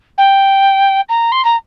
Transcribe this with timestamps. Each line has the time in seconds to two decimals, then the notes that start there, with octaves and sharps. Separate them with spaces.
0.18 G5
1.09 A#5
1.32 C6
1.44 A#5